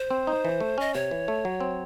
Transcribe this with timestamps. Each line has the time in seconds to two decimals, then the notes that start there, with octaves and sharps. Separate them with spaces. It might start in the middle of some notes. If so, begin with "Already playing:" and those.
Already playing: C5
0.11 C4
0.27 D#4
0.45 E3
0.61 A3
0.78 C#4 D#5
0.94 C3 C#5
1.11 E3
1.28 A3
1.45 F#3
1.60 C4